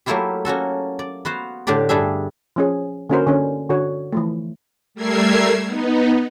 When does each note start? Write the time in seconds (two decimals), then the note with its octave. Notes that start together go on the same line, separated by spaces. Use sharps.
0.06 F#3 A3 A#3 E4 F4 G4
0.45 A#3 C#4 F#4 A4
0.99 D5
1.25 B3 F#4 C5 F5
1.67 A2 D3 D4 G4 D5
1.89 G2 G3 D4 G#4 E5
2.56 F3 C#4 G#4
3.09 D3 A#3 C#4 F#4 A#4 C5
3.27 D3 C#4
3.70 D3 F#4 C#5
4.12 E3 F3 A3
4.94 G3 A3 A#4 E6 G#6 C7
5.66 B3 D#4